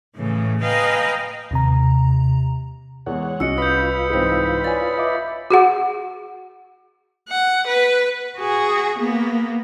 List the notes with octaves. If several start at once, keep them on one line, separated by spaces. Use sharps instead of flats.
A2 C#3 E3
B4 D#5 F5 G5 G#5 A#5
D#2 C3 A#5
E2 G#3 C#5 F#5
C2 C#4 F#4 D#5 E6 C#7
F4 B4 B5 D#6 G6
G#2 E3 C4
C#5 D5 G#5 A6
D#5 E5 D6
F#4 G#4 F#5
F#5
B4
F#4 G#4
A#3 B3